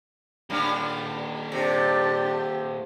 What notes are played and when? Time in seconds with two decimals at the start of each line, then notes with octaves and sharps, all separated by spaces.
0.50 A#2 D#3 G3 C#4 D4
1.52 C3 D4 G4